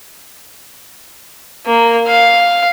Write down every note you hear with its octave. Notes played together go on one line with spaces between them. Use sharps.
A#3
F5